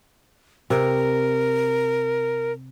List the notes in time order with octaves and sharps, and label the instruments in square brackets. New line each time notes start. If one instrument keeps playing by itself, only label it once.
[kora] C3 [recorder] A#4